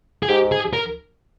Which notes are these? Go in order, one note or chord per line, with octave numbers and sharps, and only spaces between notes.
G#4
G#2 G4
G#4
A#4